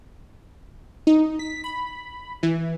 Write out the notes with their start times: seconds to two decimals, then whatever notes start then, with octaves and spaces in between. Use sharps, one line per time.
1.07 D#4
1.39 B6
1.64 B5
2.43 E3